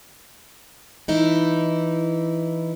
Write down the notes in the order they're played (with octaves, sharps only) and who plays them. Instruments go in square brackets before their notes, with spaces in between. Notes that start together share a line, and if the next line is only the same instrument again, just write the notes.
[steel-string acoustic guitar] E3 D#4 E4